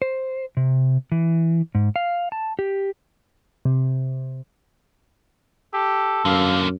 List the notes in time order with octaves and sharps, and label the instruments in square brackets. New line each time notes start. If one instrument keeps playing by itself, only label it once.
[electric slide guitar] C5
C3
E3
G#2
F5
A5
G4
[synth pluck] C3
[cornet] G4 [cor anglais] A4
[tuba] F#2 [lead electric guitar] D3 A#3 [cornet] F5